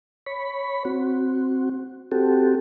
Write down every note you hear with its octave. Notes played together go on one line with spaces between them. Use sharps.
C#5 B5
C4 F#4
C4 F#4 G4 A4